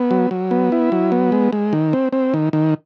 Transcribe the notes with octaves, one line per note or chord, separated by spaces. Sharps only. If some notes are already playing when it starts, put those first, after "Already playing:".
Already playing: B3
F#3
F#3
B3
E4
F#3
B3
G#3
G#3
D#3
C4
C4
D#3
D#3